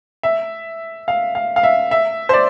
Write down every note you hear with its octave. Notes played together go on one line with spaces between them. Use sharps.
E5
F5
F5
F5
E5
E5
C5
D5